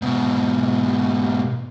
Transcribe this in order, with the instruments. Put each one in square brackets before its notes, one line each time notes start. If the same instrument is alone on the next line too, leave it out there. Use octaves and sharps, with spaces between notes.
[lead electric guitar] G#2 B2